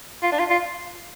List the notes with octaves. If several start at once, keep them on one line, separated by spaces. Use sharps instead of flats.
F4
D4
F4
F4